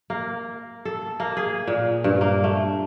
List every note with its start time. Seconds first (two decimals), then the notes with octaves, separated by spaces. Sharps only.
0.10 A#3
0.85 A4
1.20 A#3
1.37 G#4
1.67 A#2
2.04 G2
2.21 A#3
2.44 A3